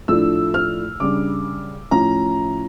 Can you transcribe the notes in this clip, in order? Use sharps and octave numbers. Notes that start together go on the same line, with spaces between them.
A2 F3 A3 D4 E6
F6
C#3 G3 D4 D6
A2 F3 C#4 A#5